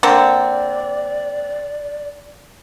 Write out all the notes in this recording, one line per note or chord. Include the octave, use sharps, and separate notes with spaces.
D3 A#3 C4 D5